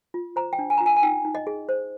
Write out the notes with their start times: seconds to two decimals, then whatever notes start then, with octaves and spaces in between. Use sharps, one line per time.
0.14 F4
0.36 C5 A#5
0.53 G5
0.59 D4
0.70 G#5
0.78 A#5
0.80 F4
0.86 G#5
0.96 G#5
1.03 D#4 G5
1.25 D#4
1.35 D#5
1.47 G#4
1.69 C5